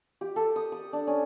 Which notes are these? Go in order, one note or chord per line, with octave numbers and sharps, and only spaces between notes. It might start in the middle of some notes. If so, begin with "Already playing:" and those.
G4
A4
D#6
D#6
D4
C#4